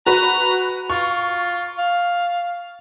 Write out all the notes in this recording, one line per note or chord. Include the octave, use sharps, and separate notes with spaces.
F#4 B4 A#5
F4 C#6
F5